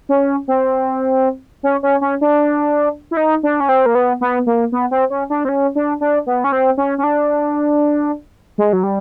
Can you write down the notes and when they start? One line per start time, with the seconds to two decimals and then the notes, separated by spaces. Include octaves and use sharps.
0.09 C#4
0.48 C4
1.63 C#4
1.83 C#4
2.01 C#4
2.21 D4
3.11 E4
3.17 D#4
3.43 D4
3.60 C#4
3.69 C4
3.86 A#3
3.95 B3
4.21 B3
4.47 A#3
4.72 B3
4.91 C4
5.10 C#4
5.30 D4
5.45 C4
5.49 C#4
5.75 D4
6.01 D4
6.27 B3
6.44 C#4
6.52 C4
6.77 C#4
6.98 C#4
7.03 D4
8.58 G#3
8.73 F#3
8.83 G3